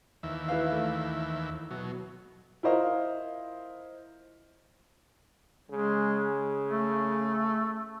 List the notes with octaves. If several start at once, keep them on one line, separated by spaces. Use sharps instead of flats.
D#2 E3 E5
E4 B4 F5
A3
B2 F#3
E4 F4 A#4 C5 D#5 F5
C#3 G#3
A3